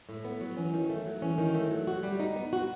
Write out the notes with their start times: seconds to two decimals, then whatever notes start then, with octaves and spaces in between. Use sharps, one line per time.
0.09 A2
0.25 B3
0.41 F#3
0.57 E3 C#4
0.73 D#3
0.90 A3
1.06 F#3
1.22 E3 C#4
1.38 D#3
1.54 A3
1.71 F#3
1.87 F#4
2.03 G3
2.20 D#4
2.36 B3
2.53 F#4